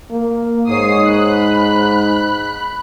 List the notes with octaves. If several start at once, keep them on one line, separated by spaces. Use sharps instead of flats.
A#3
G#2 C#5 D#6 C7
B5 F#6